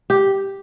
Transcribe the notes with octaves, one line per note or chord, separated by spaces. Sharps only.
G4